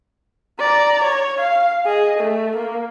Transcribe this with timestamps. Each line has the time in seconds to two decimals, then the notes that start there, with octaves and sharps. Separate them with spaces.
0.60 D5 A#5
1.03 C#5
1.40 F5
1.85 G#4 D#5
2.19 A3
2.56 A#3